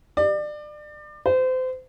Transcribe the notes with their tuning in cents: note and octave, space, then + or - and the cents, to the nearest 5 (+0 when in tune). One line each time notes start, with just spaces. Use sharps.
D5 +30
C5 -30